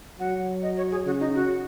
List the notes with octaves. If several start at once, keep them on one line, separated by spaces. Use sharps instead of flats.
F#3 F#5
D#5
C#5
G#4
C#3 F#4
D#4
F#4